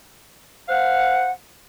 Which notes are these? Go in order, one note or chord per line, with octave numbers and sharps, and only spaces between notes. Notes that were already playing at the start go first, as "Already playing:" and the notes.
C5 F5 F#5